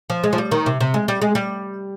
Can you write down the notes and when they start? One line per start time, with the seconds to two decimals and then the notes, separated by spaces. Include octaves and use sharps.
0.10 F3
0.24 G#3
0.33 F3
0.38 G3
0.51 D#3
0.66 C3
0.80 C3
0.94 G#3
1.08 G3
1.22 G#3
1.35 G3